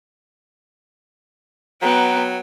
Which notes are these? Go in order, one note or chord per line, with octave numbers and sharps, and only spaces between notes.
F#3 B3 G5 A#5